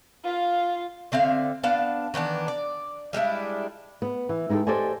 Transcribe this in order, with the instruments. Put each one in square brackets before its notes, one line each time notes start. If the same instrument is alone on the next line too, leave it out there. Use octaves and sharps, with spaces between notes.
[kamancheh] F4 F5
[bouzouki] D3 C4 E5 F5
B3 D4 F5 A5
D#3 E3 B3 D4
D5
G3 G#3 D4 E4
[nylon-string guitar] B3
E3
G#3 D#4 E4 G4 A4
G4 A4 C5 D5 D#5 G#5